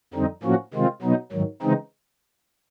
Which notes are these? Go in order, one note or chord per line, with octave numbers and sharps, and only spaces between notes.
F2 D3 G3 C4 D#4
A2 F3 A#3 C#4 F#4
C3 D#3 G#3 C4 F4
B2 F#3 B3 D#4
G#2 D#3 F#3
C#3 E3 G#3 C4 D#4